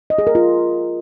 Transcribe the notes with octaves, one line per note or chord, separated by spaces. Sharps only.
D#5
G#4
A#4
F4